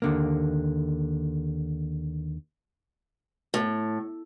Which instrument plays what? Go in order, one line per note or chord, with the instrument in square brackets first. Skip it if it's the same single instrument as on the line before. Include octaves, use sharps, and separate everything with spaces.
[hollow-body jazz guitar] D#2 D3 A#3
[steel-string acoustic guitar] A2